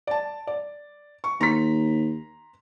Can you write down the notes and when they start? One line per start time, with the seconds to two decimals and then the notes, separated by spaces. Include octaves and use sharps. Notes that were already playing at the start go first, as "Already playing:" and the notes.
0.07 D5 A5
0.47 D5
1.24 C#6
1.41 D#2 A#5 C6 B6